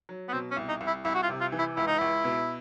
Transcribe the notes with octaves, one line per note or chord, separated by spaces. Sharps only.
F#3
B3
B2 C4
C#4
C2
D#4
C2
E4
C2 E4
F#4
F4
C3
F4
E3
E4
C#2 E4
D#4
C#2 E4
B2